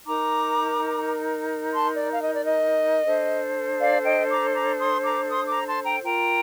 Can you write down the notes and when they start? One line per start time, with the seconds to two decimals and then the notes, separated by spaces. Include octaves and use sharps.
0.06 D#4 A#4 A#5 D6
1.74 A5 C6
1.93 D5
2.12 F5
2.22 D#5
2.33 D5
2.44 D#5
3.05 D4 A4 C5
3.79 D5 F5
4.04 D#5 G5
4.29 A#5 D6
4.54 A#5 D6
4.78 C6 D#6
5.03 A#5 D6
5.28 C6 D#6
5.47 A#5 D6
5.66 A5 C6
5.84 G5 A#5
6.03 F4 A#4 G5 A#5